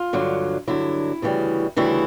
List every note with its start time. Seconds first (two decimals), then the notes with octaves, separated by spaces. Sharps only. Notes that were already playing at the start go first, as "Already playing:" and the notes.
Already playing: F4
0.13 G2 D3 F#3
0.68 G2 D3 F#3 E4
1.22 D2 C#3 E3 G3
1.76 D2 C#3 E3 G3 E4